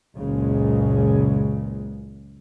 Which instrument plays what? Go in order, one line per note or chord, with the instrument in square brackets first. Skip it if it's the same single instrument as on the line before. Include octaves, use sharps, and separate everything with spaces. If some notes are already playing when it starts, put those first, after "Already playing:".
[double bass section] F#1 C#2 A#2 C#3 G#3